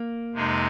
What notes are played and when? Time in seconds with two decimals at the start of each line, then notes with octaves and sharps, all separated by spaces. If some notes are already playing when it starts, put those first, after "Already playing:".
Already playing: A#3
0.34 F2 C3 G#3 D#4